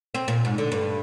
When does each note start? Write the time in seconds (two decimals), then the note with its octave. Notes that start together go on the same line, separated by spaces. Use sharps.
0.14 C4
0.28 A#2
0.45 G#2
0.58 D3
0.72 G2